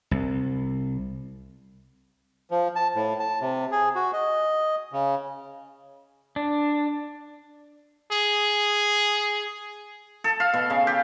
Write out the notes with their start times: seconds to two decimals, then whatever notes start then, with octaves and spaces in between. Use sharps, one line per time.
0.11 C2
2.51 F3
2.76 A5
2.95 A2
3.19 A5
3.41 C3
3.72 G#4
3.95 F#4
4.13 D#5
4.93 C#3
6.36 D4
8.12 G#4
10.24 A4
10.40 F5
10.54 B2
10.70 C#3
10.87 G4